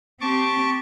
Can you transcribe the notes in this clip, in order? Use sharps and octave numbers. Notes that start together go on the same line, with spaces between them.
C4 G4 A5 C#6 D6